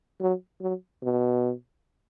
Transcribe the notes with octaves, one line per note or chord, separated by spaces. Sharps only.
F#3
F#3
B2